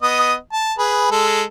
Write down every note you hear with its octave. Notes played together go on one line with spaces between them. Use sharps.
B3 D#5 D#6
A5
G#4 B4
G#3 A4